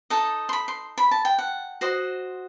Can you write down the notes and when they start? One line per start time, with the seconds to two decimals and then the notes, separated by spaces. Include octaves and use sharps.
0.10 D#4 A4 D#5 A5
0.49 C6
0.53 B5
0.68 C6
0.98 B5
1.11 A5
1.25 G5
1.39 F#5
1.81 F#4 C5 D#5